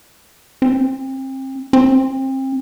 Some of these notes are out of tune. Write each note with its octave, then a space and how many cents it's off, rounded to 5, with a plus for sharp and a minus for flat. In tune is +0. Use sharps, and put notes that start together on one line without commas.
C4 +30
C4 +30